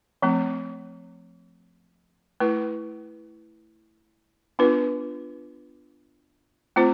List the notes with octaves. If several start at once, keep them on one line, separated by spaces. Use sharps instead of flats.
F3 A3 C4
A3 E4 B4
B3 D4 F4 B4
A3 C4 F4 C5